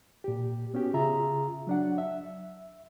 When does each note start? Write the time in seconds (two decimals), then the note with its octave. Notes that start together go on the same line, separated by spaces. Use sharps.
0.24 A#2 G4
0.74 B3 C#4 F#4 G4
0.94 C#3 F4 G#4 E5 A#5
1.67 F#3 D4 F#5
1.98 E5